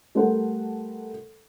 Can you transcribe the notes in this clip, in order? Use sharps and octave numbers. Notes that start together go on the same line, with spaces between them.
G3 A3 A4 A#4 C5 F#5